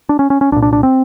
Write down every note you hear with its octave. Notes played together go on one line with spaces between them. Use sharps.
D4
C#4
C#4
C#4
C2 A#2 D4
D4
D4
C4